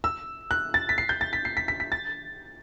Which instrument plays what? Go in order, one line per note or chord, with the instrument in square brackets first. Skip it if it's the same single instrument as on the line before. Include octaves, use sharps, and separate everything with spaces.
[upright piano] E6
F#6
A6
B6
C7
G6
A6
B6
C7
B6
B6
B6
A6